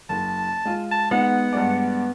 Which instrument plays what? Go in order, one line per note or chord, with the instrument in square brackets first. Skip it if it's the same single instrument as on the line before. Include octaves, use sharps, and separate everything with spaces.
[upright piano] F#1 [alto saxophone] A5
[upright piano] G#3 F4
[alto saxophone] A5
[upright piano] G#3 D#4 [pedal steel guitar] B3 [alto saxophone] F#5
[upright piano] G2 G#3 D5